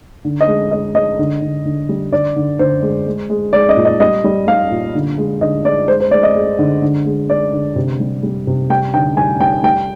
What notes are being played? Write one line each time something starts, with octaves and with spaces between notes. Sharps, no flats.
D3
D#5
G#3
G#3 D#5
G#3 D#5
D3
D3
D3
G3
D3 D5
D3
D3 C5
G#3
G#3
G#3
G#3 D5
D#5
A#2
D#5
G3 D#5
G3
G3 F5
A#2
D3
G#3
D3 D#5
G#3 D5
G#3 C5
C5
G#3 D5
D#5
G#3
D3
D3
G#3
G#3 D5
D3
C3
G3
G3
C3
G3 G5
D3 G5
G3 G#5
G3 G5
G3 G5